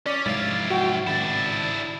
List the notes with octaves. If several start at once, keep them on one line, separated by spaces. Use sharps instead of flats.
C#4 D5 B6
F1 G#2 F#3 E4 F5 A6
F#4 G5
G#1 A2 C#3 D4 E4 A6